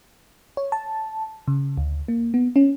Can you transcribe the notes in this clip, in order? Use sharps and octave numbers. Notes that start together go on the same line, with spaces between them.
C#5
A5
C#3
D2
A#3
B3
C#4